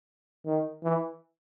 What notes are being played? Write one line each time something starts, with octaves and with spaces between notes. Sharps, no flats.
D#3
E3